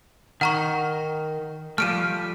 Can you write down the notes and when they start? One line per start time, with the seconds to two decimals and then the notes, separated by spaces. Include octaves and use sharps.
0.41 D#3 F#5 A#5 C#6
1.78 F3 G3 A3 F6 D7 D#7